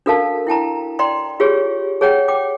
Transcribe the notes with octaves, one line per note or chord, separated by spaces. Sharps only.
D4 F#4 A4 A#4 F5 A5
E4 G5 A5 A#5
D5 G5 A#5 C6
F4 G4 G#4 C#5
G#4 C#5 F#5 G5
G5 D6